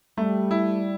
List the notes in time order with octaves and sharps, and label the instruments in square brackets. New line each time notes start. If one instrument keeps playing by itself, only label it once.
[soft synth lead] G3 [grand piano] A3
[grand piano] E4